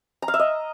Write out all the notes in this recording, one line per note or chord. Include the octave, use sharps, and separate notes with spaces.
A#5
F5
E5
D#5